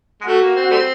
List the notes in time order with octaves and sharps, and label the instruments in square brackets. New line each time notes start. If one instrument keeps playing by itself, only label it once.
[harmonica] G#3
[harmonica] A3 [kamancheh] F#4
[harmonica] A#3
C4
G3 A3 C4